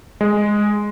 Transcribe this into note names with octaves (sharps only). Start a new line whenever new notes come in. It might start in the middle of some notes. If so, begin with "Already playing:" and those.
G#3